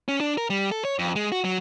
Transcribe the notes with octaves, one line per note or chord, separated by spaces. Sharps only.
C#4
D4
A#4
G3
A4
C#5
F2
G#3
F#4
F#3